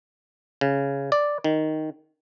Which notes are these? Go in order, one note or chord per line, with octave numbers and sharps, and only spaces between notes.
C#3
D5
D#3